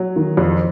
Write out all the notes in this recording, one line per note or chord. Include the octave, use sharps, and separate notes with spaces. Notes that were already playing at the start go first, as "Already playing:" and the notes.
Already playing: F#3
D#3
F2